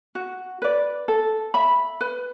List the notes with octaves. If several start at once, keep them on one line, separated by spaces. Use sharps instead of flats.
F#4
B4 D5
A4
E5 B5
B4